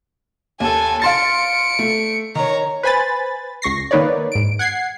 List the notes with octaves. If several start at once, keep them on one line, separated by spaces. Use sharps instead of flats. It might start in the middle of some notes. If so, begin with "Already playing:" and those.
D#2 A4 G#5
F5 C6 A6 C#7 D7
A3
D#3 C#5 A#5
B4 C5 G#5 B5 A6
C#2 C#6 A#6 C7
D#3 A#3 D#4 B4 C#5 D5
G#2 D7
F#5 G#6 C7